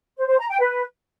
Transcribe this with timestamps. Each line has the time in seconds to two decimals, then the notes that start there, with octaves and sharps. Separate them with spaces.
0.16 C5
0.27 C5
0.38 A#5
0.48 G5
0.59 B4